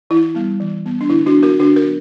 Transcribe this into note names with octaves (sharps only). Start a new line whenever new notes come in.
E3 E4
G3 B3
E3
G3 B3
D4
D3 E4
D4 F#4
F#3 B3
F#4 A#4
D3 D4 F#4
F#4 A#4
F#3 B3